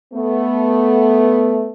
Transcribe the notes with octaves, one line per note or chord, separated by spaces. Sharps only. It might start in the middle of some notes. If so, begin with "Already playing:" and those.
A3 B3